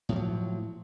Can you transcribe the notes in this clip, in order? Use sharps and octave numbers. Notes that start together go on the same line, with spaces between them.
A2 F3 F#3